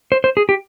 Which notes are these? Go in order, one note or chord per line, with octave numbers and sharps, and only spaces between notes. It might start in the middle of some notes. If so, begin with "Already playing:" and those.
C5
C5
G#4
G4